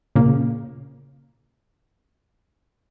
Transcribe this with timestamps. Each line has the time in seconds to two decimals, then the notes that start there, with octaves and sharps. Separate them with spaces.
0.16 A#2 C#3 A#3